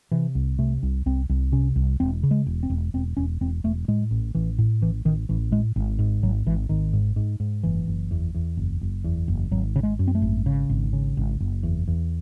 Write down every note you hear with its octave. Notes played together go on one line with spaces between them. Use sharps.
C3 E3
C2
C3 A3
C2
C2 C4
C2
C3 C#4
C2
E1 C4
C#3
G#3
E1
C4
E1
E1 C4
E1 C#4
E1 C4
E1 A3
A2 G#3
A1
A1 E3
A2
A1 E3
A1 D#3
A1 E3
A2 G#3
G#1
G#2
G#1 F#3
G#1 E3
G#1 D#3
G#2
G#2
G#2
F#1 E3
F#1
E2
E2
F#1
F#1
E2
F#1
G#1 F#3
C#3
G#3
F#2
C4
A3
G#1
C#3
G#1
C#3
G#1
F#1
E2
E2